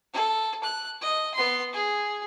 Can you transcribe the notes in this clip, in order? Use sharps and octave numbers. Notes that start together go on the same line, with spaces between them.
A4
F#6
D#5
B3 C6
G#4